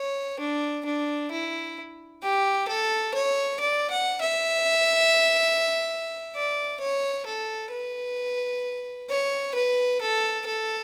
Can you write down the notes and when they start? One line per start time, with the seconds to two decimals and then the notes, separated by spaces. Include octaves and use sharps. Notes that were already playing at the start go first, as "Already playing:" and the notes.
Already playing: C#5
0.40 D4
0.85 D4
1.32 E4
2.22 G4
2.68 A4
3.14 C#5
3.60 D5
3.90 F#5
4.21 E5
6.35 D5
6.80 C#5
7.26 A4
7.71 B4
9.09 C#5
9.55 B4
10.02 A4
10.46 A4